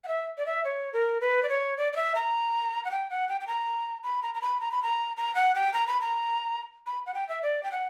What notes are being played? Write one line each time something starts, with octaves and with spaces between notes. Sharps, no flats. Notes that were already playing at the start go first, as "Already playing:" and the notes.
F#5
E5
D5
E5
C#5
A#4
B4
D5
C#5
D5
D5
E5
A#5
F#5
G5
F#5
G5
G5
A#5
B5
A#5
A#5
B5
A#5
B5
A#5
A#5
F#5
G5
A#5
B5
A#5
B5
F#5
G5
E5
D5
G5
F#5